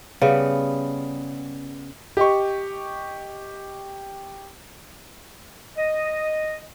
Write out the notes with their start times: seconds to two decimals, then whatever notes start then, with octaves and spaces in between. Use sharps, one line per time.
0.22 C#3 G3 B3
2.17 G4 D#5 C#6
5.77 D#5